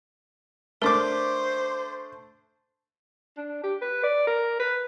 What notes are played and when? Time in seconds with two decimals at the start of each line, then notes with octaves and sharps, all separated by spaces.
0.82 A3 D4 A#4 C5 D6
3.37 D4
3.63 G4
3.82 B4
4.03 D5
4.27 A#4
4.59 B4